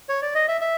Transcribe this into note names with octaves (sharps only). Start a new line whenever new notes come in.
C#5
D5
D#5
E5
E5